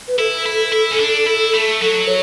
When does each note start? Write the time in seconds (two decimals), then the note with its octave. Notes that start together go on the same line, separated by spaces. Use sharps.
0.08 B4
0.19 E4 A4
0.46 E4
0.72 E4
0.92 C#4
1.00 D4
1.27 E4
1.54 A3
1.81 F#3 A4
2.08 C#5